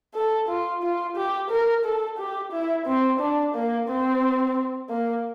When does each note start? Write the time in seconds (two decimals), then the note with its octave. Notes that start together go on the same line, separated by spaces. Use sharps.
0.15 A4
0.48 F4
0.82 F4
1.16 G4
1.50 A#4
1.85 A4
2.18 G4
2.52 E4
2.86 C4
3.20 D4
3.54 A#3
3.88 C4
4.89 A#3